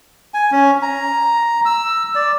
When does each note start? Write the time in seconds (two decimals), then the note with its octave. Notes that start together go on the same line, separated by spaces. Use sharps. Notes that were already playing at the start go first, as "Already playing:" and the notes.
0.34 G#5
0.52 C#4
0.82 A#5
1.65 E6
2.15 D5